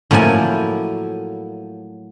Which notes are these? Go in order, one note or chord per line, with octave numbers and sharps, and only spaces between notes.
A2 F3 F#3 A#3 E4 G#5